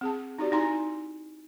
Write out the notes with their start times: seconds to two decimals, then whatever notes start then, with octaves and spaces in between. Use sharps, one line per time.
0.01 C4 G#4 A5
0.39 D#4 F#4 G4 D5
0.52 D#4 E4 G#5 A#5 C6